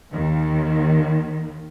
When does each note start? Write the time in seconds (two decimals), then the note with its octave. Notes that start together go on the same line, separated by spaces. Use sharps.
0.11 D#2 D#3